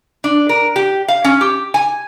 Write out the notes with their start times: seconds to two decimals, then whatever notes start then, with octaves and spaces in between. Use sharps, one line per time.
0.24 D4
0.49 A#4
0.76 G4
1.08 F5
1.24 C#4
1.41 G4
1.74 G#5